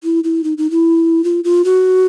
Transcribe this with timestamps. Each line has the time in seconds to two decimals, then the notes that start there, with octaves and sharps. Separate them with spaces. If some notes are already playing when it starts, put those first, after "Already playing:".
0.04 E4
0.24 E4
0.44 D#4
0.58 D#4
0.71 E4
1.24 F4
1.44 F4
1.65 F#4